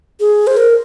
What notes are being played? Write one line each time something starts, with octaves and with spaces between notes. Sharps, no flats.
G#4
C5
A#4